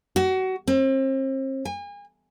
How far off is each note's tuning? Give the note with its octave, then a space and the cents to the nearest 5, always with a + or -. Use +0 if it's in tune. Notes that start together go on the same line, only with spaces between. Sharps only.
F#4 +25
C4 +35
G#5 -35